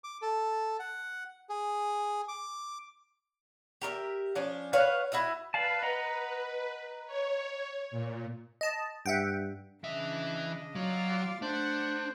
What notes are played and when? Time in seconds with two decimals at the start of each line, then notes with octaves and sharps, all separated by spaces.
0.04 D6
0.22 A4
0.79 F#5
1.49 G#4
2.28 D6
3.82 G4 A#4 D5 E5
4.35 F3 C#4 D4
4.73 B4 C#5 F5 F#5
5.12 E4 F#4 D#5 E5
5.54 B4 D5 F5 A5
5.83 D#5 F#5 A#5
7.06 C#5
7.91 A#2
8.61 D#5 A5
9.06 G2 E5 F#5 G5
9.84 C#3 E3 D4 D#5 E5
10.75 F#3 F4 D5
11.42 A3 D4 C5 F#5